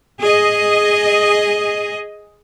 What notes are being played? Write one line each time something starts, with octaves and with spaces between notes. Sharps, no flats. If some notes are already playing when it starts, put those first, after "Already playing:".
G#4 D#5